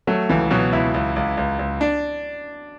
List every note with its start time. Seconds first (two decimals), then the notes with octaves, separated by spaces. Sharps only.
0.07 F#3 A3
0.29 C#2 E3
0.50 B2 F#3
0.73 C#2 E4
0.94 C#2
1.16 C#2
1.37 C#2
1.59 C#2
1.81 D4